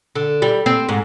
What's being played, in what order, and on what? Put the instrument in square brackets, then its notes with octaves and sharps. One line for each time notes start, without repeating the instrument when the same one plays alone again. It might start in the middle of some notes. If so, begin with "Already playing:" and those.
[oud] D3
G3
C4
G#2